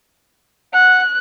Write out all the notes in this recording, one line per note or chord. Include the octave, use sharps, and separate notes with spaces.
F#5 F#6